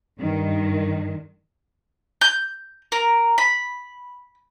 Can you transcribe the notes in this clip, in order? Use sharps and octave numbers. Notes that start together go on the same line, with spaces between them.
G2 D#3
G6
A#4
B5